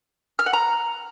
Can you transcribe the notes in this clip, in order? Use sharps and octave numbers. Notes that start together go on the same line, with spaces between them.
F6
F#5
A#5